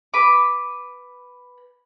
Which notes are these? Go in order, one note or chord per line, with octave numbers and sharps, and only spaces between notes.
B4 D6